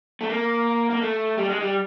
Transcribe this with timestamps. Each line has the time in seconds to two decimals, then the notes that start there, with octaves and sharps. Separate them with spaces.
0.21 A3
0.30 A#3
0.90 A#3
1.01 A3
1.37 G3
1.49 G#3
1.60 G3